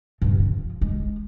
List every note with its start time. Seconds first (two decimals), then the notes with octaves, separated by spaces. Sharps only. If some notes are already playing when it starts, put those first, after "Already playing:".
0.22 G2 C3
0.39 F3
0.81 G#3